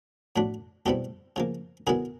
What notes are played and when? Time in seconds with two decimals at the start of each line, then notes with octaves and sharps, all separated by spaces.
0.36 A2 F#3 A3 D4
0.86 E2 B2 G3 C4 E4 G4 A4
1.36 C#3 F3 A#3
1.87 D3 F#3 B3 E4 G#4 A#4